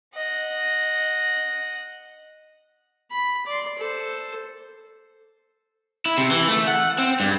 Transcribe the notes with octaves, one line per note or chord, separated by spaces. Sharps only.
D#5 F#5
B5
D5 C6
A4 C5
E4
C3
E3
A3
F#5
C4
G2